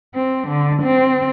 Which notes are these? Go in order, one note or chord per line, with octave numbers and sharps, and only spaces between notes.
C4
D3
C4